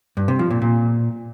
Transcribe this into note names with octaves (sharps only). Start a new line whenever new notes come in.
G2
C3
F3
A#2
A#2